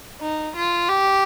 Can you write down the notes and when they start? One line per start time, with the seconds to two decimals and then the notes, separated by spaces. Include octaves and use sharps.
0.21 D#4
0.56 F4
0.89 G4